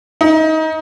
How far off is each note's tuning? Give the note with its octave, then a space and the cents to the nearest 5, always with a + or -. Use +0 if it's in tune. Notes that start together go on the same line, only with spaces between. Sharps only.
D#4 +25